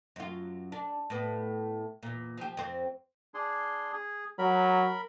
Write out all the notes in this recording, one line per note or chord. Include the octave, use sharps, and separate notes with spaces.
F#2 F4
D4
A2 B3
E2 A#2
F3 G4
F2 C4
D4 G#4 C6
G#4
F#3 A#4 B5